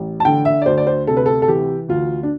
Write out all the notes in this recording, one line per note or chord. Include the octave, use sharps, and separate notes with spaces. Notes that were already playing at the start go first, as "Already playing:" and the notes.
Already playing: A1
A5
D3 G5
E5
D5
D2 C5
D5
C5
C3 A4
B4
A4
A4
E3 G4
D2 F4
D4